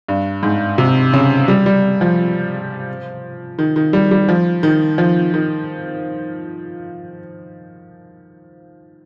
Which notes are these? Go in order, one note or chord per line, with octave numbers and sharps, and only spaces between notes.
G2
G#2
C3
C#3
G3
G3
F3
D#3
D#3
G3
G3
F3
D#3
F3
D#3